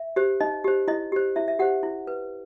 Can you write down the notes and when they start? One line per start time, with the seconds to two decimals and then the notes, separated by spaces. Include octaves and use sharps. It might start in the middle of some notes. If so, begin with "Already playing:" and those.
Already playing: E5
0.16 G4 C5
0.41 D#4 D#5
0.64 G4 C5
0.88 E4 D#5
1.12 G4 C5
1.36 E4 E5
1.48 E5
1.59 G4 C5 F#5
1.83 E4
2.07 B4